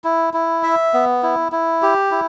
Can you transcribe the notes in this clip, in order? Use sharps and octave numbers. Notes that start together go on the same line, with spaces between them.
E4
E4
E5
B3
E4
E4
G4
E4